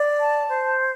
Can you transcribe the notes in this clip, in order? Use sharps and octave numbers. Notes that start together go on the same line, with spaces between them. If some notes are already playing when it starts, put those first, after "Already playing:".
Already playing: D5
A5
C5